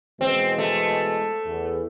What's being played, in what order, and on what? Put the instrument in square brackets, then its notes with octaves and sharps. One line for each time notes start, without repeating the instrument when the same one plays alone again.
[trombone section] B2 E3 G#3 [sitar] C4
[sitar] A3
[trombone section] E2